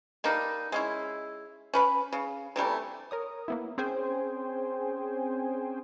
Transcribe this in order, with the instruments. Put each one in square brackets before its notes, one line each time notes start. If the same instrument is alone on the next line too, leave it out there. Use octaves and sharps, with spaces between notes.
[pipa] G3 A#3 D4 D#4
G#3 C#4 E4
C#4 B4 B5
C#3
C3 E3 G3 A3
[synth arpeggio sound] A#4 C#5 D#6
A#3 B3 E4
C4 C#4 G#4 C5 G5 G#5